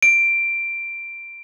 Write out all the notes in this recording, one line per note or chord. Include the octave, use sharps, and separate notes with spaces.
D7